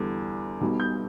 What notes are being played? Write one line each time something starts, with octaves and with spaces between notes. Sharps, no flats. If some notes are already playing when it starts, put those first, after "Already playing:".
Already playing: E2 D3 G3
B1 B2 G3
G6